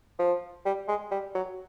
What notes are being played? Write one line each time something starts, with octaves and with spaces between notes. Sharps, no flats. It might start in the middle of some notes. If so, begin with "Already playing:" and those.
F3
G3
G#3
G3
F#3